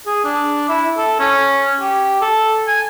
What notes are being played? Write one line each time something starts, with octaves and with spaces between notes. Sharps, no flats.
G#4
D4
E4
A4
C#4
G4
A4
G#5